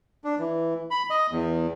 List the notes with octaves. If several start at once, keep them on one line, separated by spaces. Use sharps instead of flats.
D4
E3
B5
D#5
E2